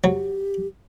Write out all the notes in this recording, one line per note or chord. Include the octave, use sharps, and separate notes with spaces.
F#3 G4